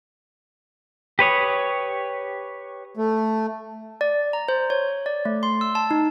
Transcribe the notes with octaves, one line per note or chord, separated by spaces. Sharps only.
G4 B4 C#5 D#6
A3
D5
A#5
C5
C#5
D5
A3
C6
E6
A5
D#4